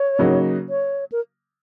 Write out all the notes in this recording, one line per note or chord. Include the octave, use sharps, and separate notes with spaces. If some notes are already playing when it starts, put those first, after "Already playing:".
Already playing: C#5
C#3 F#3 A#3 D#4 F#4
C#5
A#4